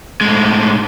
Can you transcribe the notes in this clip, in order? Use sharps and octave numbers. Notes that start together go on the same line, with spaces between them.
A2 G#3